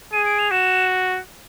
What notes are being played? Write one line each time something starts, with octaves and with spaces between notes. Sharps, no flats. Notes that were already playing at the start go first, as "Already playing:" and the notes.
G#4 D#7
D7
F7
F#4 E7